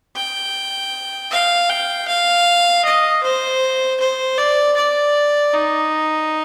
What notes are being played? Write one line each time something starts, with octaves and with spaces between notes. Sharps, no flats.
G5
F5
G5
F5
D#5
C5
C5
D5
D5
D#4